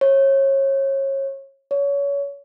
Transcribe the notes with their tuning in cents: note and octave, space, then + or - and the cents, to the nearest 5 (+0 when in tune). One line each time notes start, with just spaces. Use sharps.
C#5 -30
C#5 +25